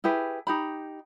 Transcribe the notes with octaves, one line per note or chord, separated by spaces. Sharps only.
E4 G4 G#4 B4
D#4 G4 B5